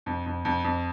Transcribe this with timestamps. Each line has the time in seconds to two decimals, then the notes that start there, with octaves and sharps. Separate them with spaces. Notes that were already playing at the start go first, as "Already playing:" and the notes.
0.06 F2
0.26 F2
0.45 F2
0.64 F2